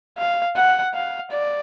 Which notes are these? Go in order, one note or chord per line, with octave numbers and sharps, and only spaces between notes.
F5
F#5
F5
D5